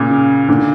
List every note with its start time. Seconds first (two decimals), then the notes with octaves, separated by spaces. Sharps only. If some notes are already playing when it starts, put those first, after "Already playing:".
Already playing: A#2 C#3
0.10 C#3
0.49 A#2 D3